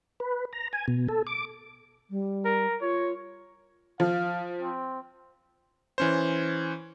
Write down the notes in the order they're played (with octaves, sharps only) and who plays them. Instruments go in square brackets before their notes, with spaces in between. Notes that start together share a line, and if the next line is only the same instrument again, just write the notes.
[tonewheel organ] B4
A#5
G#5
B2
A4
D6
[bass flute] G3
[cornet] A#4
[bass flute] F4 [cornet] C#5
[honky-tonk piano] F3 [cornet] F5
[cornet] C4
[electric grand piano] E3 C#4 C5